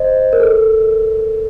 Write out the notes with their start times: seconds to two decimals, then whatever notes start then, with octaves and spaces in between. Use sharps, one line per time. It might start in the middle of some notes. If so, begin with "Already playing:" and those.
Already playing: C5 D#5
0.33 A#4
0.40 A4